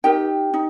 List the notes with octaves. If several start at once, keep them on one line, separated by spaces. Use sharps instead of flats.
D#4 G4 A#4 G5
D#4